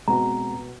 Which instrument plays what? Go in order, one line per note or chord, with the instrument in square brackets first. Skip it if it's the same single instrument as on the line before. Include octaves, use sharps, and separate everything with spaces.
[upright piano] B2 [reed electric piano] G#3 C4 F#4 [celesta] A#5